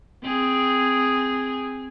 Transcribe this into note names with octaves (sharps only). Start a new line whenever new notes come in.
C4 G#4